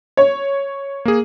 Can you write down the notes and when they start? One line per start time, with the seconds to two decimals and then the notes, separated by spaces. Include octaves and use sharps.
0.17 C#5
1.05 A#3 G#4